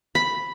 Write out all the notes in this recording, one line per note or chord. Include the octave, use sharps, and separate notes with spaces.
B5